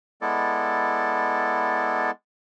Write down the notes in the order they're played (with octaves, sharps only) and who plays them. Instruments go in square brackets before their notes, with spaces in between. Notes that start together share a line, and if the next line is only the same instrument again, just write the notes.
[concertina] G#3 B3 E4 A4 D5